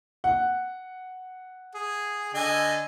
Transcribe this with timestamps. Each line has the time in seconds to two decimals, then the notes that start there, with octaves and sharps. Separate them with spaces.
0.24 F#5
1.75 G#4
2.34 D3 D#5 G#5